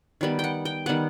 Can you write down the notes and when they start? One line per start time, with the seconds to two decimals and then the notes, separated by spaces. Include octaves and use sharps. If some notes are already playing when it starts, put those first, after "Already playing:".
0.21 D#3 G3 B3
0.39 F#5 G5
0.65 G5
0.86 D#3 G3 B3 F#5